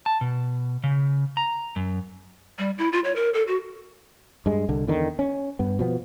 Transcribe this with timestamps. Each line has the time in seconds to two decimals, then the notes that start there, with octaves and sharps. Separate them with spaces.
0.06 A5
0.21 B2
0.84 C#3
1.37 A#5
1.76 F#2
2.58 G3
2.78 E4
2.93 F4
3.04 C#5
3.16 A#4
3.34 A4
3.48 F#4
4.46 G2 G#3
4.69 C2 D3
4.87 E2 D3 D#3
5.19 C#4
5.59 G2 B3
5.79 B2 F3 B3